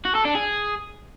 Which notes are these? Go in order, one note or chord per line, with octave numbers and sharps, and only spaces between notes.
F#4
A4
D4
G#4